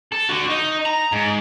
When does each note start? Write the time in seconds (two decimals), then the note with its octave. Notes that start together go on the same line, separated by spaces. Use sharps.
0.12 A4
0.29 D3 F#4
0.50 D#4
0.85 A#5
1.12 G#2